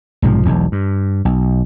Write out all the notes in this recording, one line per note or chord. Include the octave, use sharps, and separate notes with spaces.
B1 G#2 C3 F3
E1 B1 E2
G2
B1